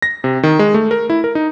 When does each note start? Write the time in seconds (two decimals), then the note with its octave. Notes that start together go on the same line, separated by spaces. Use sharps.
0.02 A#6
0.24 C3
0.43 D#3
0.59 G#3
0.74 A3
0.91 A#4
1.10 E4
1.24 A#4
1.35 D#4